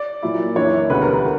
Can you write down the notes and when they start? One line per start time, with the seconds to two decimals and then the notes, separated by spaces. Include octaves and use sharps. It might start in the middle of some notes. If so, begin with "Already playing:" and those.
Already playing: D5
0.23 A#2 F#3 A#3 E4
0.55 F#2 E3 A#3 D4 C#5
0.90 E1 D2 C#3 G3 B4
1.02 A#4
1.13 A#4